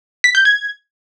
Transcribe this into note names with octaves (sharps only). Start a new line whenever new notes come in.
B6
G6
G#6